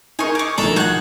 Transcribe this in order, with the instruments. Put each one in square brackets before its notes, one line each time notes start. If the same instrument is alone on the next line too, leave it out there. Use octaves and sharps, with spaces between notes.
[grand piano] D#4 G#4 A#4 [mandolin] G#5 C#6
[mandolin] C#6 D6 [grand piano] G#6
[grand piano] A#1 D#3 [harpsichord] D4 A4 [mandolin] A#5
[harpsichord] F#4 F#5 [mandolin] G#4 G6